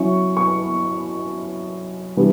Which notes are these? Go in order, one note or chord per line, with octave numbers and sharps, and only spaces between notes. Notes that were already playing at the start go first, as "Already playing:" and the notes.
Already playing: F#3 C#4 E4 C#6
C#6
E3 G3 B3 D4